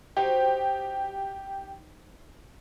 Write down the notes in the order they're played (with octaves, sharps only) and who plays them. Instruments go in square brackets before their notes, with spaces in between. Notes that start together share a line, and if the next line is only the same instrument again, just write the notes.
[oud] D#4 F#4 C5 [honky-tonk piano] G4